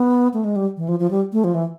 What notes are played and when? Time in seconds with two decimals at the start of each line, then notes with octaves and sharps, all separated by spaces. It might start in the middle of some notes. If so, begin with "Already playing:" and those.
Already playing: B3
0.34 A3
0.44 G#3
0.56 G3
0.77 E3
0.89 F3
1.00 F3
1.11 G3
1.33 A3
1.44 F3
1.54 E3